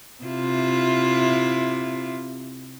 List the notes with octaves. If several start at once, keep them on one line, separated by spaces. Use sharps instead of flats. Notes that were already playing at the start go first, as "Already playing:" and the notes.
C3 E4 F4